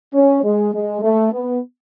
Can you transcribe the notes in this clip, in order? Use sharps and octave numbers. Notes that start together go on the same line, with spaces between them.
C#4
G#3
G#3
A3
B3